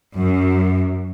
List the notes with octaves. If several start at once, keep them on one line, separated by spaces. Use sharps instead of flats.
F#2